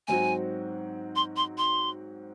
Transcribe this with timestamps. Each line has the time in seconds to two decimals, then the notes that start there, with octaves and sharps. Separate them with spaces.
0.08 G#2 F#3 C4 F#4 G#5
1.16 C6
1.36 C6
1.58 C6